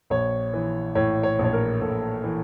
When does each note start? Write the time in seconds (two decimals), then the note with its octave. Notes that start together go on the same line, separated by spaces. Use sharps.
0.10 A#1 C#5
0.53 E3
0.95 A2 C#5
1.23 C#5
1.39 A#1
1.44 C#5
1.53 A#4
1.81 A#1 A4
2.24 E3